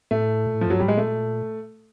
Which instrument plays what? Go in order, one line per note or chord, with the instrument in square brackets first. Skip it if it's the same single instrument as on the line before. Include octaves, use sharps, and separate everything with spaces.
[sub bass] A2 [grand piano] A3
[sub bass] A#2
A2
[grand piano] F3
[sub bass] F#2
[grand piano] F#3
[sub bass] G2
[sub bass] G#2 [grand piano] G3
[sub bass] A2 [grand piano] G#3
[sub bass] A#2 [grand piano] A3